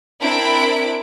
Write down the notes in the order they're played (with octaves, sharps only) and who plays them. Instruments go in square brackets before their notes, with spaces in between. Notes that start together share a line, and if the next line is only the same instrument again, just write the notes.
[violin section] C4 D4 E4 A#4 B5 D7